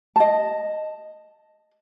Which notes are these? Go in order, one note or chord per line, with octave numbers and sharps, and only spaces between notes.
D#5 A5